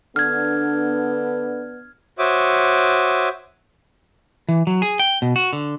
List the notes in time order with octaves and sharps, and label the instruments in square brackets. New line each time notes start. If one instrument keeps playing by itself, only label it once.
[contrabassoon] D3 [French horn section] B3 D4 [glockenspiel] F6 G#6
[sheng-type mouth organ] F#4 C5 C#5 E5 D6 D#6
[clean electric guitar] E3
F#3
G#4
G5
B2
F#4
D3